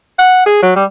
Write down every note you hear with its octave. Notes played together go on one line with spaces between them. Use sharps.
F#5
G#4
F#3
G3